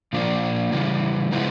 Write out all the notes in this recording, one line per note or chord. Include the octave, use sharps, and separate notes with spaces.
A#2 F3 A#3 D4
C#3 E3 G3
C#3 F3 G#3 B3 E4